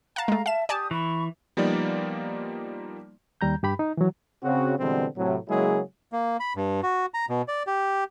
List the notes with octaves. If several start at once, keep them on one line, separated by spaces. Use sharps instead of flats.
F5 F#5 A5 A#5
G#3 A3
E5 F5 A5 E7
G4 D5 G#5 A5 D#6
E3 B5 C#6
F3 G3 A#3 B3 D#4 D5
D#2 G3 A#5 G6
G2 G4 B5
D#4
E3 F#3
C#3 C4 F#4
B2 D3 E3 G3 G#3 C4
A2 C3 F#3
C#3 F#3 G#3 A#3 E4 G#4
A#3
B5
G2
F#4
A#5
B2
D5
G4